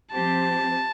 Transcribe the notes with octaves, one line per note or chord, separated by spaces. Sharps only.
F3 C4 G4 C5 A5